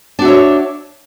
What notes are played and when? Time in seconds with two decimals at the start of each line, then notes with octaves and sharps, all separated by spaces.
0.19 D4
0.22 F#4
0.25 E5
0.28 C#5